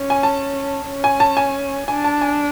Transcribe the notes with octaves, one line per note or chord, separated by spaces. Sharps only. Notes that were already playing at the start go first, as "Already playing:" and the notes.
Already playing: C#4
G#5
A5
C#4
G#5
A5
G#5
D4 G#5
A5
G#5